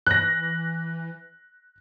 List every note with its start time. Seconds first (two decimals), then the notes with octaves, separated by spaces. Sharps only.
0.07 E3 F#6 A#6